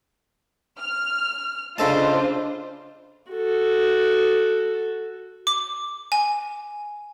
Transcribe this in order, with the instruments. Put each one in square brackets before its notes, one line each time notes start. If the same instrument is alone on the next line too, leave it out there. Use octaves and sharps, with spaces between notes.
[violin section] F6
[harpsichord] C#3 A4 A5 [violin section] D4 F4 C5 [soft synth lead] D#5
[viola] F#4 A4
[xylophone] D6
G#5